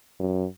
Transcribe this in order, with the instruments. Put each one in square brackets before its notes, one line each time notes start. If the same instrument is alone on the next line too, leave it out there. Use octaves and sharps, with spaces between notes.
[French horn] F#2